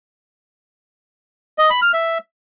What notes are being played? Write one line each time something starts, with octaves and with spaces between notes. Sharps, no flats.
D#5
B5
F6
E5